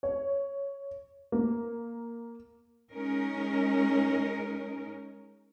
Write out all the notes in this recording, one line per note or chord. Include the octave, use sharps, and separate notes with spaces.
C#5
A#3
G#3 C#4 D#4 A#4